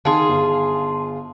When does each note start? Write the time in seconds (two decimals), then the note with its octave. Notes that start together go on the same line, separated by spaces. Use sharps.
0.05 D#3 F4 G#4 A5 C6
0.28 G1